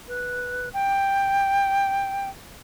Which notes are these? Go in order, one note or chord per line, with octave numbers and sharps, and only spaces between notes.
B4
G5